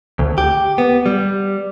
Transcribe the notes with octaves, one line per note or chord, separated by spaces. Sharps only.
D2
G4
B3
G3